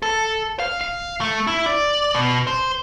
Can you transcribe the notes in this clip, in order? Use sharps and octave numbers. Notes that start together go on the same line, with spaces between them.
A4
F5
F5
A3
E4
D5
B2
C5